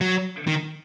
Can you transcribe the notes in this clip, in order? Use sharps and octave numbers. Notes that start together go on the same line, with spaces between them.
F#3
D#3